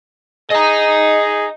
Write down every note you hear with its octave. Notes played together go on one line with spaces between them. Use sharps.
G#4 D#5 A#5